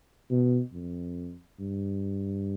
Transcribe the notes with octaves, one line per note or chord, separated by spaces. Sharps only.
B2
F2
G2